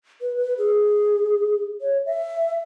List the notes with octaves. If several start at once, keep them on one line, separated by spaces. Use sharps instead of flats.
B4
B4
G#4
C#5
E5